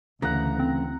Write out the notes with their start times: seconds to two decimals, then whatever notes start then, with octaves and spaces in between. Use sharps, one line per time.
0.22 D2 C#3 E3 A3 F#5 A#5
0.59 C4